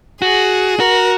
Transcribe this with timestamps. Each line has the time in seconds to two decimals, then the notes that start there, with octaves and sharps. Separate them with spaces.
0.21 F#4 G#4
0.79 F#4 A#4